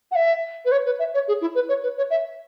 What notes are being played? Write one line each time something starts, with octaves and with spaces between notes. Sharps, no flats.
F#5
E5
B4
C#5
B4
E5
C#5
G#4
E4
B4
C#5
B4
C#5
E5